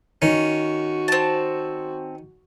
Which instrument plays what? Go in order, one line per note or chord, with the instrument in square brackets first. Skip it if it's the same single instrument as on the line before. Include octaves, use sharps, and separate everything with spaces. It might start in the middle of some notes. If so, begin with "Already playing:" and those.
[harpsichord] D#3 C#4 [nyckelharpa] F#4
[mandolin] C4 A5